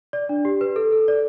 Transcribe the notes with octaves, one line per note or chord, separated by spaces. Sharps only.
D5
D4
G4
B4
A4
A4
D5